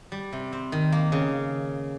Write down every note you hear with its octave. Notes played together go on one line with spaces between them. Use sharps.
G3
C3
C4
D#3
A#3
C#3